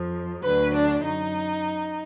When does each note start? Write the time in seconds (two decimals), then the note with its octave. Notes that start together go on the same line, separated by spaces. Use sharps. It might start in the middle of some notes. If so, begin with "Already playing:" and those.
Already playing: F2 F3
0.42 D2 D3 F#3 B4
0.73 D4
1.02 F#2 D#4